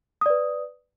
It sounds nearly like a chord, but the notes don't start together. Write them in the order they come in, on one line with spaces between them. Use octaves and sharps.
D#6 D5 B4